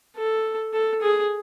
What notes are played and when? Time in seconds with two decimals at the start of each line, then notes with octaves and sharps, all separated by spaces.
0.16 A4
0.73 A4
1.02 G#4